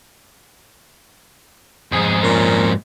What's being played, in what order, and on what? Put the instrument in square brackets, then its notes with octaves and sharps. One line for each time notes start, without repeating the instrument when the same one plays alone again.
[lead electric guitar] F2 G#2 [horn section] G#4
[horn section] A#2 C#4